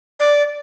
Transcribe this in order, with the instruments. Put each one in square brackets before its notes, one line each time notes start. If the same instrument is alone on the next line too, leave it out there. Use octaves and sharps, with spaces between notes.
[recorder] D5